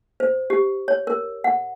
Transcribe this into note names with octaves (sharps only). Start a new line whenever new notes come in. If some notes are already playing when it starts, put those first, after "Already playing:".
C5
G4
C#5
A#4
F#5